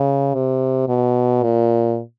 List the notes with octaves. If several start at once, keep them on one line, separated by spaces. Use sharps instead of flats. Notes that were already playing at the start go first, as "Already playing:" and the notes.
Already playing: C#3
C3
B2
A#2